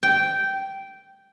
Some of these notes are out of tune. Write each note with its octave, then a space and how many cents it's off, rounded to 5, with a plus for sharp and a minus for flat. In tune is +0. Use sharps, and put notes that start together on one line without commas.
G5 -10